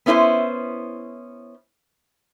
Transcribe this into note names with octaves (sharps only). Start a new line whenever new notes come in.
B3 C#4 E4 B4 C5